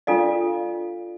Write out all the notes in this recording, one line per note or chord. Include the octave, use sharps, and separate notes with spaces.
D4 F4 A4 D5 F5